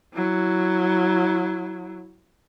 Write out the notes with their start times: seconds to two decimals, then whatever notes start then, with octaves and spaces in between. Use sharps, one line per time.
0.14 F#3 E4